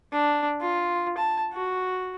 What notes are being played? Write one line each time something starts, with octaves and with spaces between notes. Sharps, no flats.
D4
F4
A5
F#4